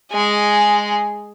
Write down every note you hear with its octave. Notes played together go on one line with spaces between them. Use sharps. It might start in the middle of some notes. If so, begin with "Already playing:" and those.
G#3 G#4